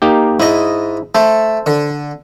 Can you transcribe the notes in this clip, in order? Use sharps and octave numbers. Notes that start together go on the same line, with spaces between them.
A#3 D#4 G4
G#2 E4 D#5
A3 A4 C5
D3